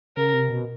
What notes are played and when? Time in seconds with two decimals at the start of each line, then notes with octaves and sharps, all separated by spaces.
0.17 C#3 A#4
0.33 C3
0.50 B2